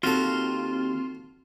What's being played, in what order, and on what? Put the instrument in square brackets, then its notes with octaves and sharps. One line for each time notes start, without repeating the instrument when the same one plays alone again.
[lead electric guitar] D#2 [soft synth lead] C4 [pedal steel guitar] F4 [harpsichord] F#4 A4